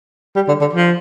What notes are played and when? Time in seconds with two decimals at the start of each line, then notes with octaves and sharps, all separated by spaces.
0.36 G3
0.48 D3
0.61 D3
0.73 F3